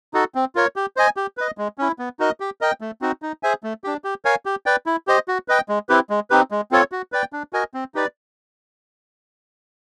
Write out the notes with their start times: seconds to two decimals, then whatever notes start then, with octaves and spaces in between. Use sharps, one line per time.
0.14 D#4 F#4 A4
0.35 C4
0.55 F4 A#4 C#5
0.76 G4
0.97 C5 D#5 G#5
1.17 G4
1.37 B4 D#5
1.58 G#3
1.78 C#4 E4
1.99 B3
2.19 D#4 F#4 A#4 D#5
2.40 G4
2.61 A#4 D#5 G5
2.81 A3
3.01 C4 D#4 F#4
3.22 D#4
3.43 G#4 C5 E5 G#5
3.63 A3
3.84 D4 G4
4.04 G4
4.25 A#4 C#5 F5 G#5
4.46 G4
4.66 B4 D5 G5
4.86 E4
5.07 G4 C5 D#5
5.28 F#4
5.48 B4 D#5 G5
5.69 G#3
5.89 C4 E4 G4 B4
6.10 G#3
6.30 C4 D#4 G4 B4
6.51 G#3
6.72 C4 F4 A4 C#5
6.92 F#4
7.12 B4 D5 G5
7.33 D4
7.53 F#4 A#4 D#5 G#5
7.74 C4
7.95 D#4 G4 B4 D5